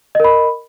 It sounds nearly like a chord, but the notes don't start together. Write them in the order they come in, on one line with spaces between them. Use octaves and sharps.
D#5 A#4 B5